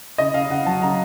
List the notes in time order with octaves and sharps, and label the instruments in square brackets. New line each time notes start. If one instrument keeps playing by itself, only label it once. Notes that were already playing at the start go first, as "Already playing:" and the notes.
[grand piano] C#3 D#5
C#3 F5
C#3 F#5
F#3 A5
C#3 A#5